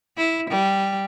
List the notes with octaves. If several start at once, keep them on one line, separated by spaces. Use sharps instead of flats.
E4
G3